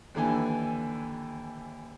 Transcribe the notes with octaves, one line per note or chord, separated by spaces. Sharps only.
D#2 D3 E3 G#5